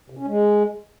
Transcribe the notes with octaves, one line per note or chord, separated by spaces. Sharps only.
C3
C#4
G#3